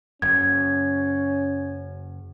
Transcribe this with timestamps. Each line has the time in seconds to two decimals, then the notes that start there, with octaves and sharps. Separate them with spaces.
0.22 F#1 F#2 C#4 G#6